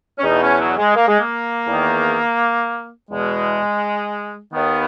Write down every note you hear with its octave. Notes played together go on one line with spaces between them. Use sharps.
C#4
E2 B2 D#4
C#4
F#3
G#3
A#3
G#3
A#3
E2 D#3
E2 B2 G#3
D#2 D#3 B3